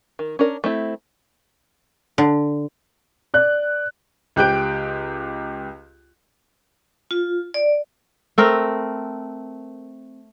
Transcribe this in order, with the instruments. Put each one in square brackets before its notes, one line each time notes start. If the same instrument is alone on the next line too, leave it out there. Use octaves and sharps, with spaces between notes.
[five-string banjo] D#3
C#4 D4 A#4
A3 C4 E4
[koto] D3
[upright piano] D5 F#6
C#2 G4 F#6 G6 D7
[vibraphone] F4
D5
[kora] A3 C4 A#4